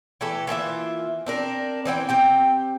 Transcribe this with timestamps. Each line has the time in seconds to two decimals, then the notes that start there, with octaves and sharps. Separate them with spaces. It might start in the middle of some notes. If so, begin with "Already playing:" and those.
0.21 E3 A3 G4 A4
0.47 E3 A#3 F4 E5
1.26 C4 D4 A#4
1.85 E3 C4 D#5 G5
2.09 C4 G4 G5